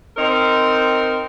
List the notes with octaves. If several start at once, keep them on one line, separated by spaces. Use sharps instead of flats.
C4 D#4 A#4 C5